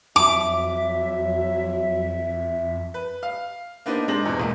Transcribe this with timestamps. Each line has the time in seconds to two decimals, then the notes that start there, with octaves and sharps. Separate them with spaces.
0.16 F2 F#3 E5 D6
2.94 B4
3.23 F5
3.86 A#3 B3 D4 D#4 C5
4.08 G#2 G#3 C4 D4 A#6 F#7
4.25 E2 B2
4.39 E1 G#2 A#3